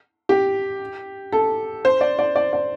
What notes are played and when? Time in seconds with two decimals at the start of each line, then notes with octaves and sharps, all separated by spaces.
0.29 G4
1.32 A4
1.85 C5
2.01 D5
2.19 D5
2.36 D5
2.53 D5